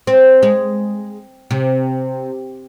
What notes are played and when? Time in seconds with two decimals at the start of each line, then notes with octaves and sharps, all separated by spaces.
0.07 C4
0.43 G#3
1.51 C3